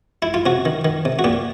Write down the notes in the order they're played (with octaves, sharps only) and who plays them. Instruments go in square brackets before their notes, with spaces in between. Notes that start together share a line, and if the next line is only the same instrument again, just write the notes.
[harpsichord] E4
F4
C3 F#4
D#3
D#3
C3
F#4
A#2 G4